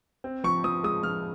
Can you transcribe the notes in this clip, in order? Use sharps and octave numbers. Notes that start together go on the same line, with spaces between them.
C4
F3 C#6
F3 D#6
G#3 D#6
F3 F6